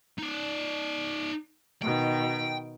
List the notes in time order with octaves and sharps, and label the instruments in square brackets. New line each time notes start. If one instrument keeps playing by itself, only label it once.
[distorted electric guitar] D#4 D5
[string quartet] B2 D#3 [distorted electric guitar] G5